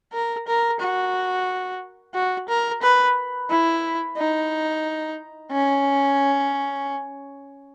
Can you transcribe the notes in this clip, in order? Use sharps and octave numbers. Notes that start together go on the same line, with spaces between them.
A#4
A#4
F#4
F#4
A#4
B4
E4
D#4
C#4